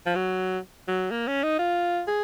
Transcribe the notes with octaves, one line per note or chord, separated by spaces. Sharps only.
F3
F#3
F#3
A#3
C#4
D#4
F4
G#4